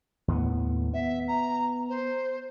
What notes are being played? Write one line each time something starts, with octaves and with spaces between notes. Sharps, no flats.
D#2 A2 B3
B3 E5
A#5
C5